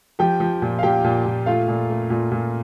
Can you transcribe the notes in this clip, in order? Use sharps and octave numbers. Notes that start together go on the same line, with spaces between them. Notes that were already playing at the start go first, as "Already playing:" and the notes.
F3 G4 G5
F3
A#2
F5
A#2 G4 G5
A#2
A#2
A3 F4 F5
A#2
A3
A#2
A#2